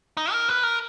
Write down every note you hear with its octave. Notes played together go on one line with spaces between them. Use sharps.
D#4
A#4
B4
A#4